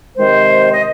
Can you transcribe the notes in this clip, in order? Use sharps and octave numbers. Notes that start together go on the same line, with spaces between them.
C3 D#3 G#3 C5
D#5